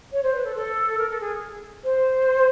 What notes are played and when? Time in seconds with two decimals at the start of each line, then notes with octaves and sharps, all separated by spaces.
0.12 C#5
0.23 C5
0.34 B4
0.44 A4
0.56 A4
0.98 A#4
1.10 A4
1.20 G#4
1.84 C5